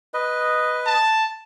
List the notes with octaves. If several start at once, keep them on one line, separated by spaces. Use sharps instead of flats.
B4 D#5
A5